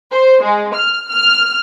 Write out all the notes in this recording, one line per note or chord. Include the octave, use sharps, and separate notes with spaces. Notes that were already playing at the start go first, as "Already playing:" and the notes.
C5
G#3
F6
F6